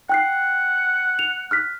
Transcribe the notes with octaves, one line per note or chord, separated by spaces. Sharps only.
F#5 G5 F#6 C7
F7
F6 F#6 B6